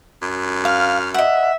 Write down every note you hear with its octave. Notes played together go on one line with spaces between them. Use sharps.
F#2
F5 F6
D#5 E5 F#5